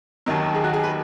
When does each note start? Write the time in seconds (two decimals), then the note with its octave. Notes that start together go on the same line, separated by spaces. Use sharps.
0.26 D#2 D#3 F#3
0.55 G#4
0.64 F#4
0.73 G#4
0.83 B4